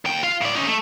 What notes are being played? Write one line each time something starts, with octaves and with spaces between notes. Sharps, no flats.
D#2 G5
F4 F5
A2 D5
C#4 D#4
A3